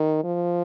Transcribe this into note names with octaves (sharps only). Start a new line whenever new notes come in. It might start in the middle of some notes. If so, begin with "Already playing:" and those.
Already playing: D#3
F3